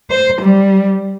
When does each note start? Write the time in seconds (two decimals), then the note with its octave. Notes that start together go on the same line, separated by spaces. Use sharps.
0.11 C5
0.41 G3